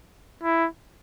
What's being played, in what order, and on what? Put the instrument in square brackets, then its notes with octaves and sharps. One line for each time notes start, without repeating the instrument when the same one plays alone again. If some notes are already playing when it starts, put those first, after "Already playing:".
[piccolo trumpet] E4